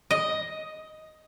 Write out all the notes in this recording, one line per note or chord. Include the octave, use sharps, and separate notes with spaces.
D#5